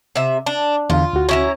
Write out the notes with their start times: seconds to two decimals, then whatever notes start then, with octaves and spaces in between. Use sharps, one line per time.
0.16 C3 E5
0.46 D4
0.90 E2 D3 F4 F5
1.13 D2 F#4
1.29 C#4 E4 A#5